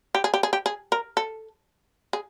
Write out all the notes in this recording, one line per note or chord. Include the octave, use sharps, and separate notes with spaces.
G4
G#4
G4
G#4
G4
G#4
A#4
A4
G#4